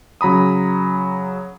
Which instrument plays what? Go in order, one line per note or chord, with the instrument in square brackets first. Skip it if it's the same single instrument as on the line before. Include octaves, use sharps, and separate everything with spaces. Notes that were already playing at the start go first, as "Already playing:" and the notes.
[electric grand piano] C#3 F#3 A#5 B5 D#6